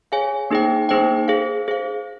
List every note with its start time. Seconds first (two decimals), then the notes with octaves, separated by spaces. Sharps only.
0.12 G#4 C#5 F5 G#5
0.50 A#3 D#4 G#4 C5 G5
0.89 A#3 D#4 G#4 C5 G5
1.28 G#4 C5 F5
1.68 G#4 C5 F5